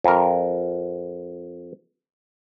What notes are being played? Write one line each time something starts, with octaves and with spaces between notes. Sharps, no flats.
F2 A#4